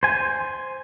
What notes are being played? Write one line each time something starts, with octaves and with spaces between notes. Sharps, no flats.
C5 G#5